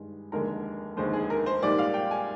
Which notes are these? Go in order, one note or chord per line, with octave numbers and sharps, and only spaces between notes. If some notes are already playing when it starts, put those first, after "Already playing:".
Already playing: G2 D#3 G#3
F1 D#2 D3 G#3 A#4
F1 D#2 D3 G#3 C5
G#4
A#4
C5
A#1 G#2 G3 A#3 D5
F5
G5
G#5